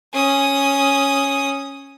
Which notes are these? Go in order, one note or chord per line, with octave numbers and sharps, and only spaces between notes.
C#4 D#6